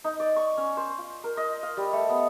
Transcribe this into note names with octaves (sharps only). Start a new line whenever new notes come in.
D#4
D5
C#6
C#4
C5
F4
A#4
D#5
F5
G3
A3
B3